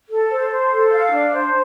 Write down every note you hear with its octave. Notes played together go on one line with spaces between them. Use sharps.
A4
C5
C5
A4
F5
D4
C5